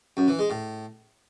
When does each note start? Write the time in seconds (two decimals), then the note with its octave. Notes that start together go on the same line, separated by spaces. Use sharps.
0.17 F#2
0.28 E3
0.39 G#3
0.50 A2